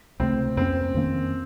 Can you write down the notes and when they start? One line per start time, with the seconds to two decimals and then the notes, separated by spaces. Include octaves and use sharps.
0.20 C#2 C3 F#3 A3 C4
0.57 F2 D#3 A#3 C4 C#4
0.94 F2 D#3 A#3 C#4